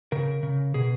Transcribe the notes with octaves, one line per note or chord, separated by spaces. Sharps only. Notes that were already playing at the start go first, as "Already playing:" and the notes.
C#3 A#4
C#3
B2 G#4